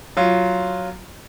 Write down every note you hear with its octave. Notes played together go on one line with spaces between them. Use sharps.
F#3 F4